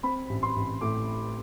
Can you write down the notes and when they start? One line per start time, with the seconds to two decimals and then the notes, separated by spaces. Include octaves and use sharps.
0.03 C4 B5
0.29 A1
0.43 C6
0.56 A1
0.81 A2 D6